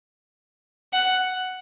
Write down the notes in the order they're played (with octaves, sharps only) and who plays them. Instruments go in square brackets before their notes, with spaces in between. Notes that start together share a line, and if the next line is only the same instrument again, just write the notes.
[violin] F#5